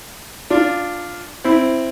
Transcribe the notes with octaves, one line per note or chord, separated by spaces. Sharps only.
D4 F4
C4 E4